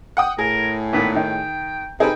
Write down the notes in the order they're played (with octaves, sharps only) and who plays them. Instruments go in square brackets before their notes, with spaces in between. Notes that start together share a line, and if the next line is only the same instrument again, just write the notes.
[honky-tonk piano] F#5 G5 D#6
[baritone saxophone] A2 [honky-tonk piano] G#4 [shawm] A#4
[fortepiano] A#2 D#3 B3 [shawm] B4
[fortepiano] D#3 D#4 [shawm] G5
[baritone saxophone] C3 [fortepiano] D#4 [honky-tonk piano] G#4 A4 B4 [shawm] G5